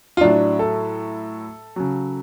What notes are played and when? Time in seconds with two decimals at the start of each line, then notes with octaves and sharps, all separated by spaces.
0.17 F4
0.21 A2 F#3 D4
0.59 A4
1.76 C#3 F#3